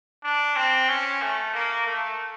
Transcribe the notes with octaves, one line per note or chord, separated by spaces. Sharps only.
D4
C4
C#4
A3
A#3
A3